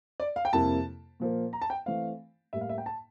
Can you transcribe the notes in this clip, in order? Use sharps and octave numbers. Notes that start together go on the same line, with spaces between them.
D5
F5
G5
F2 C3 G3 A#3 E4 A5
A#2 F3 A#3
A#5
A5
G5
E3 A3 C4 F5
A2 G3 A#3 E5
F5
E5
G5
A5